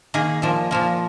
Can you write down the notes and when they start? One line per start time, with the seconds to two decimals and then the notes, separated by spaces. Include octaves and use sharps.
0.14 D#3 A#3 G#4
0.42 A#2 F3 A#3
0.71 A#2 F3 A#3